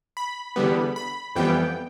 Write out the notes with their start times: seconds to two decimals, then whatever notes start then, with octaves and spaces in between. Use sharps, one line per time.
0.17 B5
0.56 E2 D3 G3 B3
0.96 B5
1.36 F2 E3 G3 B3 G5